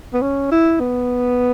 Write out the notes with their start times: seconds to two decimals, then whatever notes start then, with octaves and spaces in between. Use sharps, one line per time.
0.14 B3
0.22 C#4
0.51 E4
0.80 B3